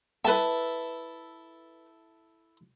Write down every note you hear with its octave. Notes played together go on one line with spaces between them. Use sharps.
E4 A4 B4 E5 A5